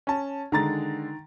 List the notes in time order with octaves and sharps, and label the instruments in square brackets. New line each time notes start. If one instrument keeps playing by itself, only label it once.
[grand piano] C#4 A5
[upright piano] D3 G#3 [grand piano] D#3 A#5 A6